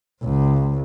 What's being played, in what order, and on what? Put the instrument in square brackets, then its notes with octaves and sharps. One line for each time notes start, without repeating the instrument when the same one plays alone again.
[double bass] C#2